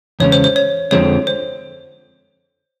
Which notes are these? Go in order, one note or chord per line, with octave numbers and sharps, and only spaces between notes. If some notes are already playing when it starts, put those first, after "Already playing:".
E2 C#3 E3 G#3 C#4 C#5
C5
C5
C#5
F2 D3 F3 G#3 C4 C#5
C5